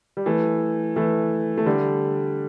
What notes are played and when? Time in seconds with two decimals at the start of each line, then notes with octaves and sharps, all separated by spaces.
0.17 G3
0.26 E3 A3
0.96 E3 A3
1.57 A3
1.66 D3 G3